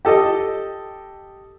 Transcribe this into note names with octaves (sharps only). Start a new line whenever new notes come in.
G4 A4 D#5